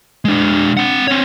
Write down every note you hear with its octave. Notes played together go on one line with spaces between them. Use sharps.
G#3 D4
C4 F#5
C4 C#5